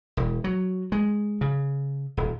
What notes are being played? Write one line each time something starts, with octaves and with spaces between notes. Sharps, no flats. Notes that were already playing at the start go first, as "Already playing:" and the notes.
E1
F#3
G#3
C#3
D#1